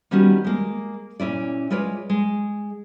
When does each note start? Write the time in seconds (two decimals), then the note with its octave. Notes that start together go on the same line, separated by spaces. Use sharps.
0.11 D#3 G3 B3 C#4 F#4 G4
0.44 G#3 A#3
1.20 A#2 C#4 E4 D5
1.70 G#3 F4 B4 C#5 D5
2.10 G#3